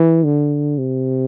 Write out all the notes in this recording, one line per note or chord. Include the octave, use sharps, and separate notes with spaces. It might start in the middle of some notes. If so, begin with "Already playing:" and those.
Already playing: E3
D3
C3